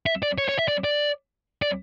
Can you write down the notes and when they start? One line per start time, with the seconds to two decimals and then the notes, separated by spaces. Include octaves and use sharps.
0.06 E5
0.23 D5
0.38 C#5
0.49 C#5
0.59 E5
0.68 D5
0.84 D5
1.62 D5